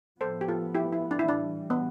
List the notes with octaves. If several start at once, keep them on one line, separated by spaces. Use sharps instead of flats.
A2 F3 B3 A4 C5
G4
F4 A4
E4 G4
E4
D4
E4
A2 E3 G3 D4
B3